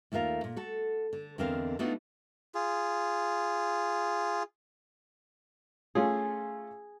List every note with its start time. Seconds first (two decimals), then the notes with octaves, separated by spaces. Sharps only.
0.12 D#2 A3 F4 A#4 F5
0.44 A#2
0.57 F#4 A4
1.13 D3
1.38 E2 D3 C4 A#4 D#5 F5
1.79 A3 B3 D4 D#4 F4 F#4
2.55 F4 G#4
5.95 A3 C#4 F4 G#4